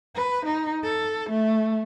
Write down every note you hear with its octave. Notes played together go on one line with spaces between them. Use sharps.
B4
D#4
A4
A3